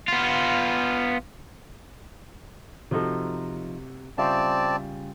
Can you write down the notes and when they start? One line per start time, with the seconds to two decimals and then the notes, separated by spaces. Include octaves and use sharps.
0.08 B3 F4
2.91 C3 F3 D#4 F#4 A4
4.18 C#3 G3 C4 F4 D5 E5 A5